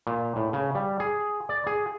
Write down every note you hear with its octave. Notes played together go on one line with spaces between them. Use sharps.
A#2
A2
C#3
G3
G#4
D5
G#4